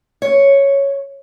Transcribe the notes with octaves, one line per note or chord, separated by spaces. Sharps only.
C#5